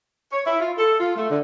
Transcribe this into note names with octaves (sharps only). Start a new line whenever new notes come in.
C#5
E4
F4
A4
F4
A3
D3